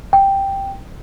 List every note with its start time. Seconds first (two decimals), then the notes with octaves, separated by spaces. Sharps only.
0.13 G5